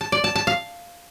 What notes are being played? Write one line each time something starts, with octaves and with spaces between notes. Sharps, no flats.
A5
D5
A5
A5
F5